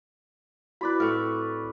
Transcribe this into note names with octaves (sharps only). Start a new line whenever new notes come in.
E4 F#4 B4 D5 B5
A2 C4 C#6 F6